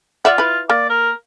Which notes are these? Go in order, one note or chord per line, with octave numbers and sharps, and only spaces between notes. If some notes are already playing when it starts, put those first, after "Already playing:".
F4 D5 E5 F#5
E4 B4
A#3 D5
A#4